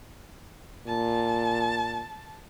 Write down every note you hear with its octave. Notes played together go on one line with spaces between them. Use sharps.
A#2 A5